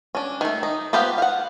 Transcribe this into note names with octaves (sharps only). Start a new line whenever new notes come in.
C#4 D4
D#3 A3
D#4
B3 F4 G4 C5 F5
F5 F#5